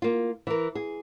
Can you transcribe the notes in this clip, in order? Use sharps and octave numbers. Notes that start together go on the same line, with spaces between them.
A#3 F4
E3 A#4
G#4